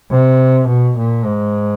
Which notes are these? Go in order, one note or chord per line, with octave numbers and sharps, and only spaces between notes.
C3
B2
A#2
G#2